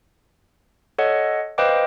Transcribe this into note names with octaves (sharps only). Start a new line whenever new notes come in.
A4 C#5 D#5 F#5
B4 C5 D#5 F5 G5 D6